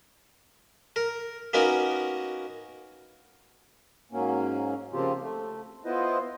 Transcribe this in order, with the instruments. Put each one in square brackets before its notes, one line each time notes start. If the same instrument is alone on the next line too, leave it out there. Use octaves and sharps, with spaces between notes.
[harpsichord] A#4
A#3 B3 C#4 D#4 F#4 A#4
[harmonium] G#2 F#3 A#3 C#4
C#3 F3 A#3 C4 F4 G4
A3
B3 E4 F4 B4 C5 D#5